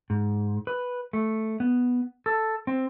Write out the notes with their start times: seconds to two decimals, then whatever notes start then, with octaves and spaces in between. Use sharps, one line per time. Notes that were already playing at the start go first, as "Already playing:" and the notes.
0.10 G#2
0.67 B4
1.13 A3
1.60 B3
2.26 A4
2.67 C4